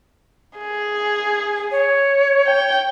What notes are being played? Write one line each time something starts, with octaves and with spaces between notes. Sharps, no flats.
G#4
C#5
G5